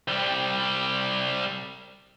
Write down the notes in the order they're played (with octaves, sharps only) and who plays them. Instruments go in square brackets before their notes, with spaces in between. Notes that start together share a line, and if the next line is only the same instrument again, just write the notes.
[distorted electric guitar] C2 G3